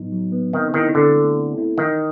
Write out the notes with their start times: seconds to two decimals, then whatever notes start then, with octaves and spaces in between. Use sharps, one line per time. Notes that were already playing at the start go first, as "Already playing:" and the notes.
Already playing: A2 F#3 B3 D#4
0.12 F#3
0.32 B3
0.53 D#3 C4
0.74 D#3 E4
0.95 D3 A4
1.16 A3
1.37 C4
1.58 E4
1.78 D#3 E3